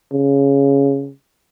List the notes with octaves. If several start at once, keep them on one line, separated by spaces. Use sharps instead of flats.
C#3